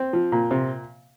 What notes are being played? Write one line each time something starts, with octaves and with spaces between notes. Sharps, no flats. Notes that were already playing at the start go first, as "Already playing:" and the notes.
Already playing: C4
F3
A#2
C3